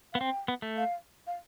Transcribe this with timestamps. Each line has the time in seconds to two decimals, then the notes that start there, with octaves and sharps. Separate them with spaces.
0.13 B3 F5
0.21 C4 G5
0.48 B3
0.62 A3
0.77 F5
1.27 F5